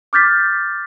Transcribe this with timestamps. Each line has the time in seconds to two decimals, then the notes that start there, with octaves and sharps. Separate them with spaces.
0.13 D6 F6 G6 A6 B6